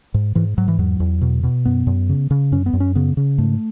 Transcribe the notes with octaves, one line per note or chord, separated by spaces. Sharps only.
G#2
G#2 E3
G#2 F#3
E3
E2 F#3
E2
B2
B2
F#2 B3
F#2
C#3
C#3
F#2 C#4
B3
F#2
C#4
C#3 B3
C#3
G#2 A3